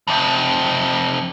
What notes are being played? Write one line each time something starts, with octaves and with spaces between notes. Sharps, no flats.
F2 C3